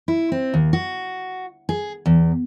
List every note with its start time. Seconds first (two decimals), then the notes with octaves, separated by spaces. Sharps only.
0.08 E4
0.32 C4
0.54 D#2
0.73 F#4
1.69 G#4
2.06 E2